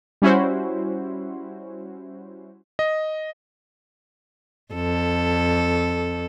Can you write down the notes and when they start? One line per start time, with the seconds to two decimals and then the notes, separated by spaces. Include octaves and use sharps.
0.22 G3 C#4 E4 F#4 C5
2.79 D#5
4.74 F2 A4